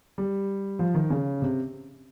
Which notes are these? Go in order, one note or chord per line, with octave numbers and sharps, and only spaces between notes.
G3
F3
D#3
C#3
C3